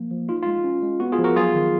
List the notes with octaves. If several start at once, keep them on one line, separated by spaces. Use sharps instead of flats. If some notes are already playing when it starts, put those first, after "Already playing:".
Already playing: F3 A#3
F3
D#4 F4
G#3 F4
C#4
G#3
B3 F#4
F4 G#4
F3
F#4 A#4
F#3 F4 G#4
D#3